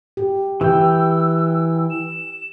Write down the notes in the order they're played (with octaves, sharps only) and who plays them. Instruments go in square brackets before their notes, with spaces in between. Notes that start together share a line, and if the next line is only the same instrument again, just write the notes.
[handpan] G4
[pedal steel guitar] E3 G5 [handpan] G4 [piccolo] E6
[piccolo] E7